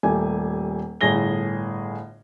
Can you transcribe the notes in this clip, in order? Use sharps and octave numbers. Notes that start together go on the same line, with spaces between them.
D#1 A3 G4 G#5
G1 A2 G#4 A#6 G7